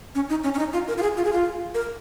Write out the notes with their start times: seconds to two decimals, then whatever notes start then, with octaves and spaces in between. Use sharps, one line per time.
0.15 C#4
0.30 D#4
0.44 C#4
0.54 C#4
0.59 D#4
0.73 F4
0.88 A#4
0.98 F4
1.02 G#4
1.17 F4
1.25 G#4
1.33 F4
1.74 A#4